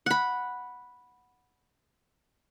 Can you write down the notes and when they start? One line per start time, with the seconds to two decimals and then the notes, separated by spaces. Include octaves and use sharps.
0.06 F#5 B5